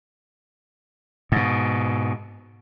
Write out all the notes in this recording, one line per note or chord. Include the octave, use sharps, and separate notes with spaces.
G#2 B2